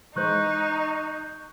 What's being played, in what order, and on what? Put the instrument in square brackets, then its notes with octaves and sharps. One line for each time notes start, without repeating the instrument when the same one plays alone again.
[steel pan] E3 G#3 C5 [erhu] D#4 [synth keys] C#6 F#6 G6